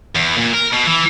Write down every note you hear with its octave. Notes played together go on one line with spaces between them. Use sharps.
E2
A#2
A#4
B2
E3